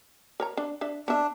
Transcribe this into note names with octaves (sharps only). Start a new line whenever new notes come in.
A#4 C#5 A#5
D4
D4 E5
B3 D4 E5